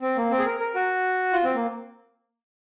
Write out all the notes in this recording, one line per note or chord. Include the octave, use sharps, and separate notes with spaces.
C4
A#3
C4
G#4
A#4
A#4
F#4
F4
C4
A#3